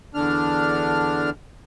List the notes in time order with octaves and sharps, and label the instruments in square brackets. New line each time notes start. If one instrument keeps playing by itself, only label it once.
[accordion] E2 D3 D4 F6